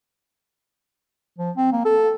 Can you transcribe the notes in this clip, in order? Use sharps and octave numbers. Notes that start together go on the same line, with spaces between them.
F3
C4
A#3
A4